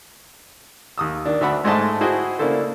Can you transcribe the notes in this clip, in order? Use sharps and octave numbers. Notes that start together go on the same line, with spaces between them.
D#2 D#6 E6
D#3 D4
D2 D4 E5 F#5 B5
G#2 G#3 A3 C5 D#5 A5
E4 F#4 G#4 C5 D#5 G5
C#3 A#3 D4 E4 A4 C5